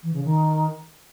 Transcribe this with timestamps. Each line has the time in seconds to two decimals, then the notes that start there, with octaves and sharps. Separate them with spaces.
0.03 E3
0.13 C#3
0.23 D#3